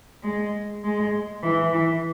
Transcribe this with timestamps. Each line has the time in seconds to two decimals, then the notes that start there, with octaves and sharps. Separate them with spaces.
0.22 G#3
0.83 G#3
1.43 E3
1.72 E3